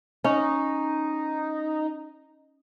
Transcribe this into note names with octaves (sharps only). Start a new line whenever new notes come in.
C#4 D#4